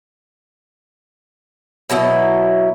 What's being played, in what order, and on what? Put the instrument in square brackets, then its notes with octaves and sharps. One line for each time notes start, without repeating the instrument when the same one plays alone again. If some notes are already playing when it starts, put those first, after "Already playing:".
[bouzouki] B2 F#3 E4 D#5